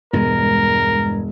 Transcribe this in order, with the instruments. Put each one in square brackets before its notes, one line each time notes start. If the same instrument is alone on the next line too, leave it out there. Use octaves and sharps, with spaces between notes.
[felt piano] E1 [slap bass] G2 G#3 [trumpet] A#4